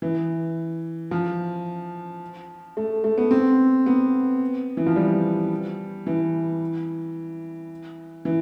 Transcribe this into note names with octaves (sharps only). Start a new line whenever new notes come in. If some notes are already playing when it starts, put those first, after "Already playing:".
E3
F3
A3
A3
B3
C4
B3
E3
F3
G3
E3
E3